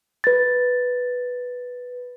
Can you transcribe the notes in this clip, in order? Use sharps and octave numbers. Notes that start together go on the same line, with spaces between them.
B4 A6